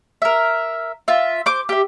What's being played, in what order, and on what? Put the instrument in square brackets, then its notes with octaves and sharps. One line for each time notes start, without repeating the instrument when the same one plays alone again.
[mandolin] A#4 E5
F4 E5
C5 D6
G4 E5